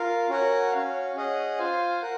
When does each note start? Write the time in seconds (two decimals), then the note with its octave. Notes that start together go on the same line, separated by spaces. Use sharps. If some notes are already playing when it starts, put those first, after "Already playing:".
Already playing: F4 A#4 F5
0.29 C#4 F#4 A#4 C#5 F#5
0.72 C#4 F#4 C#5 F5
1.16 C#4 G#4 D#5 F#5
1.58 F4 C5 F5 G#5
2.02 A#4 F#5